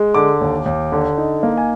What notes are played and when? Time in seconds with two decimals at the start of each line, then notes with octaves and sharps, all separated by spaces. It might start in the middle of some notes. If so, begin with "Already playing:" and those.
Already playing: G#3
0.14 D3 D6
0.41 D#2
0.66 D#2
0.92 D3
1.18 D#4
1.43 A#3
1.57 G#5